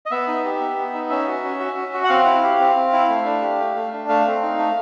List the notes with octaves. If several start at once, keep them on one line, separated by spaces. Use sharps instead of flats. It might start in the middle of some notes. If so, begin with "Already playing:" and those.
D#5
B3 E5
D#4
G4
B3
B3
D#4
C#4 E5
F#4
C#4
F#4
C#4
F#4
F#5
C4 F5
E4
G4
C4
C4
E4
A3
D4
G4
A3
A3
D4
A3 F5
C4
D#4
A3